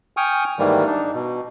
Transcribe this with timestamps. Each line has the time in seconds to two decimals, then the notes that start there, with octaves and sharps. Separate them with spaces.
0.17 G5 G#5 C#6 D#6 F6
0.59 G#2 D#3 E3 G3 A#3
0.86 D4 D#4
1.14 B2